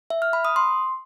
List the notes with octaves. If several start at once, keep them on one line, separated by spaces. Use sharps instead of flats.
E5
F6
B5
D#6
C6